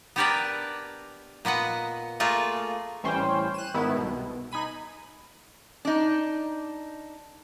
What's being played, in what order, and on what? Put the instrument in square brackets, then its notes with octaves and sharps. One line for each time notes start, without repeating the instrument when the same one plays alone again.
[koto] B3 D4 G4 A#4 B4 D5
A#2 B3 D#5 F#5
A3 A#3 F4 G#4
[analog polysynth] A1 E3 G3 C#4 C5 G5
F#6 D#7 E7
G#2 D#3 B3 E4
C2 B2
D#4 G#5 B5 D#7
[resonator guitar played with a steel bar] D4 D#4